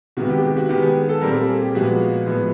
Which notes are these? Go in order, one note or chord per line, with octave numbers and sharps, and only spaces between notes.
C3 D#3 G#3 B3 F#4
G4
G4
F#4
D#3 G#3 B3 G4
G#4
A4
A#2 G3 C4 A#4
A4
G#4
G4
A#2 F3 G#3 B3 F#4
A2 F3 G#3 B3